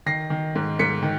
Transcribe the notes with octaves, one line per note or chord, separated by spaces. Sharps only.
D#3 A#6 C7
D#3
G#2
G#2 B6 C#7
D#3